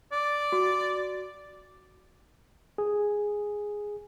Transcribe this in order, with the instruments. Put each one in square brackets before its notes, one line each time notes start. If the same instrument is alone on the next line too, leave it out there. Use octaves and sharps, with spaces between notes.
[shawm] D5
[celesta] F#4
[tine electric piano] G#4